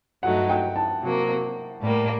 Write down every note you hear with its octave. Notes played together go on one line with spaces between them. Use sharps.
G2 F#3 A3 D#4 F#5
G5
A5
C3 F#3 A#3
A2 G3 A#3